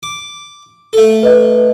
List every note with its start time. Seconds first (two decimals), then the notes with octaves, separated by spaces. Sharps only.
0.03 D6
0.93 A3 A4
1.23 B4 D#5